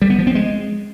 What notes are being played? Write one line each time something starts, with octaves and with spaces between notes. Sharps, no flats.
G3
B3
F3
C4
G#3